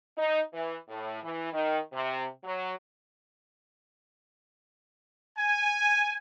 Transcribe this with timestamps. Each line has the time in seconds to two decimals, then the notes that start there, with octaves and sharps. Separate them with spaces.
0.18 D#4
0.53 E3
0.89 A2
1.23 E3
1.53 D#3
1.93 C3
2.44 F#3
5.37 G#5